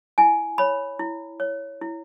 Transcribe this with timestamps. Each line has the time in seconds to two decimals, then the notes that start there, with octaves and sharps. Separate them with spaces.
0.18 E4 G#5
0.58 C#5 B5
0.99 E4
1.40 C#5
1.81 E4